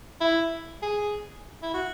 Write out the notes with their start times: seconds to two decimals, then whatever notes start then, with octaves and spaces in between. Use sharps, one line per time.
0.21 E4
0.82 G#4
1.63 E4
1.74 F#4